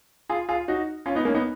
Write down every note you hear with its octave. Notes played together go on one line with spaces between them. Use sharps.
F4 G#4
F4 G#4
D#4 F#4
C#4 F4
B3 D#4
A#3 C#4
B3 D#4